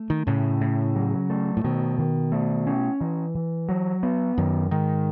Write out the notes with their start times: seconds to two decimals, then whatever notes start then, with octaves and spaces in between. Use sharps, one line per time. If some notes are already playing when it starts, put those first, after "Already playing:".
Already playing: A3
0.10 D#3
0.27 A2 C#3
0.61 A2
0.95 F#3
1.30 A3
1.57 A2
1.64 B2 D#3
1.98 D#3
2.32 A3
2.67 C#4
3.00 E3
3.35 E3
3.69 F#3
4.03 B3
4.38 F#2 D#3
4.71 G#2 D#3